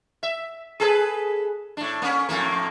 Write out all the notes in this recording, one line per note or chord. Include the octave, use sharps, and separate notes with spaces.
E5
G#4 A4 B4
A2 D4
A#3 C#4
F2 A2 A#3